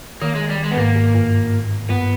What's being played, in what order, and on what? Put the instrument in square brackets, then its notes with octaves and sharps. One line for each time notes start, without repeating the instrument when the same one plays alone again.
[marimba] D#3 [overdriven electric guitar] A#3
[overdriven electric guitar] G#3
G3
G#3
B3
[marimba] G#2 [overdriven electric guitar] A#3
[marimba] G#2
G2
G#2
[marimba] G2 [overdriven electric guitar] B3